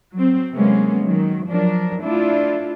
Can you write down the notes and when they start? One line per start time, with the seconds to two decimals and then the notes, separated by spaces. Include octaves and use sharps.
0.14 F#3 C4
0.55 C3 F#3 G#3 A#3 B3 C#4
1.02 D#3 F#3
1.47 F3 F#3 D4 A#4
2.03 A3 D4 E4 F4